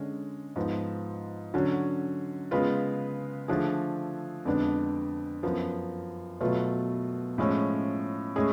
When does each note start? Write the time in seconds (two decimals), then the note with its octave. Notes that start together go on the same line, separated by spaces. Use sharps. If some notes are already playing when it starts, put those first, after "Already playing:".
Already playing: D3 G#3 C#4
0.56 G#2 F3 B3
1.54 D3 F#3 C#4
2.51 C#3 G#3 B3 F4 B4
3.48 D3 F3 A3 D4 G#4
4.45 F2 D3 G#3 B3 D4
5.43 F#2 F3 B3
6.41 B2 F#3 A3 F4 B4
7.38 A2 F3 G#3 C#4
8.36 A2 G#3 C#4 G#4